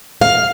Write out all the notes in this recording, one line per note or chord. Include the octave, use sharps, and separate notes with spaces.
F5